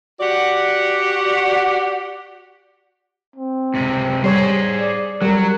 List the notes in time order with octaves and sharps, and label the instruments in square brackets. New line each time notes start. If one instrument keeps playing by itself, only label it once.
[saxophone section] F#4 G4 D5 F#5
[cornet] C4
[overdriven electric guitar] C#2 C3
[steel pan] G3 C#5 [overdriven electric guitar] G#4 C5
[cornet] D5
[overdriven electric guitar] F#3 [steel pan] G3 [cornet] A#4